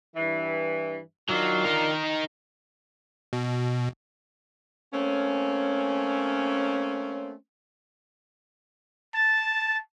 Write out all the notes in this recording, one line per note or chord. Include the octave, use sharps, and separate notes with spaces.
G2 E3
D#3 F#3 D4 F4
D#4 A#4
B2
A3 A#3 C4 C#4
A5 A6